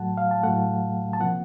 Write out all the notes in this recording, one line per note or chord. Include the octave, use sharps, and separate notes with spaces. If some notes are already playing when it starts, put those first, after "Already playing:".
Already playing: A2 F#3 A3 F#5 A5
F5
A5
A2 F#3 A3 F#5
A5
C3 F3 A#3 F#5